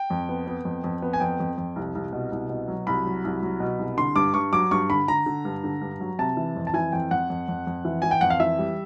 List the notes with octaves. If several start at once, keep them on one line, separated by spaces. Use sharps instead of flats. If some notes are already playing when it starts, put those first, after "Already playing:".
Already playing: G5
F2
B3
B3
F2
F2
B3
G#5
F2 G5
F2
F2
C2
C2
B2
C2
B2
F#3
C2 B5
F#3
C2
F#3
B2
C2
D3 C6
G2 D6
G2 C#6
F#3 D6
G2 C#6
D3 B5
D3 A#5
D3
G2
D3
G2
F#3
C3 A5
E3
F2
A5
E3 G#5
F2 G5
F2 F#5
F2
F2
F2
E3
E3 G#5
G5
F2 F#5
F5
E3 E5
G3